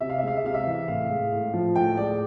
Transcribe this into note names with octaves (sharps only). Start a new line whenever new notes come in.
C3 E5
F5
E5
G#3 F5
E5
C3 F5
E5
E3
A2 F5
G#3
A2
F3
A2 G5
G#3 D5